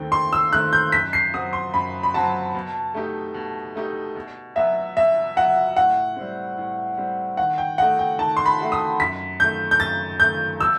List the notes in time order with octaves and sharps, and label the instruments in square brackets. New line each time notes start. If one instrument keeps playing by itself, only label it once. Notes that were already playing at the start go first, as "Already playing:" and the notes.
Already playing: [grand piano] D#2 D#3 A3 C4 [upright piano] G5
[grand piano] D#2 [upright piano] C6
[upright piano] E6
[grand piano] D#3 A3 C4 [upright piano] F#6
[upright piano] G6
[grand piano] F#2 [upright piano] B6
[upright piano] C7
[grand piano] F#3 C4 F#4 [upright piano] D#6
[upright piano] C6
[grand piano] F#2 [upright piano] B5
[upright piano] B5
[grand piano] F#3 C4 F#4 [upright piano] A5
[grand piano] B2
A3 D#4 G4
B2
A3 D#4 G4
B2
[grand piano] F#3 B3 F#4 [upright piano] E5
[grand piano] B2 [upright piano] E5
[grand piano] F#3 B3 F#4 [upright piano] F#5
[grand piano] A2 [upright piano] F#5
[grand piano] G3 C4
A2
G3 C4
[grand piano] D#3 [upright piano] F#5
[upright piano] G5
[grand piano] A3 D#4 F#4 [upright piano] F#5
[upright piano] G5
[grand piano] D#3 [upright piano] A5
[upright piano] C6
B5
[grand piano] A3 D#4 F#4
[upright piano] D#6
[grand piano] F#2 [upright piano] B6
[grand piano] D#3 A3 [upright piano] G6
[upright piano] G6
[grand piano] F#2 [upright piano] A6
[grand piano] D#3 A3 [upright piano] G6
[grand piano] B2 [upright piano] E6